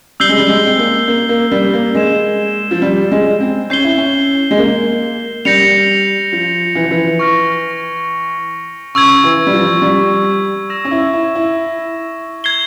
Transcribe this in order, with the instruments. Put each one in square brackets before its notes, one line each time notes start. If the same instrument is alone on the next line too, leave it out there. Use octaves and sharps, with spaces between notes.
[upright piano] G3 [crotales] E6 G6 C7 G7
[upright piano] G#3
G3
G#3
C4
A#3
A#3
A#3
G3
A#3
[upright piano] G#3 [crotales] G#6 E7 G7
[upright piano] F3
G3
G#3
C4
[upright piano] C#4 [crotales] G6 C7 G7
[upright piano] E4
C#4
G#3
A#3
[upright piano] G3 [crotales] G6 A#6 C#7 F7
[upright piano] F3
E3
F3
E3
[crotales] C#6 F6 A#6
[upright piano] C#3 [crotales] C#6 E6 G#6
[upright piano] E3
G3
F3
G3
[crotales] E6 A#6 E7
[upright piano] C#4
E4
E4
E4
[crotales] G#6 C7 G7